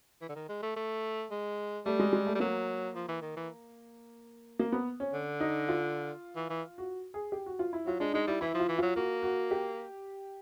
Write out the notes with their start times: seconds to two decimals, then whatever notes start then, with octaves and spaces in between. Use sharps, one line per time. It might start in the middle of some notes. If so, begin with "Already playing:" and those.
0.21 E3
0.29 D3
0.36 D#3
0.49 G#3
0.62 A3
0.76 A3
1.31 G#3
1.86 G3 A3
1.99 G#3
2.13 G#3
2.26 A3
2.35 G3
2.40 F#3 A#3
2.95 F3
3.09 E3
3.22 D#3
3.37 E3
4.59 A#3
4.72 B3
5.00 C#4
5.13 D3
5.40 D#4
5.68 F4
6.36 E3
6.50 E3
6.78 F#4
7.14 G#4
7.32 G4
7.46 F#4
7.59 F4
7.73 E4
7.86 F#3 F4
8.00 G#3 D4
8.13 G#3 D#4
8.27 G3 E4
8.41 E3 E4
8.55 F3 F4
8.68 E3
8.78 F#3 F4
8.96 A#3 F#4
9.23 F#4
9.51 G4